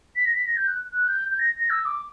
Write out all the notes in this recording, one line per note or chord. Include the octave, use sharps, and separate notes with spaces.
B6
A#6
B6
A#6
G6
F#6
F#6
G6
G6
A#6
A#6
E6
D6